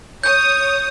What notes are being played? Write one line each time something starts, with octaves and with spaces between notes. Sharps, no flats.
C#5 D#6 G6